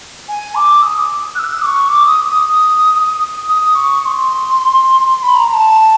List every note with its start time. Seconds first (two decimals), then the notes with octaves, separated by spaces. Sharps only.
0.28 G#5
0.55 D6
0.82 E6
0.86 D#6
1.35 F#6
1.39 E6
1.62 D6
1.66 C#6
1.88 D6
2.06 D#6
2.24 D#6
3.49 D#6
3.75 C#6
4.02 C#6
4.05 C6
5.08 C6
5.22 B5
5.35 A#5
5.49 A#5
5.53 A5